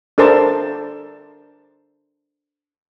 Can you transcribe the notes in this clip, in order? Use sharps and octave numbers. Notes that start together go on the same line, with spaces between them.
D4 A4 A#4 C5 A5